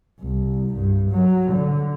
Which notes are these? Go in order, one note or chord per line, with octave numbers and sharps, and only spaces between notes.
C2
G2
F#3
D3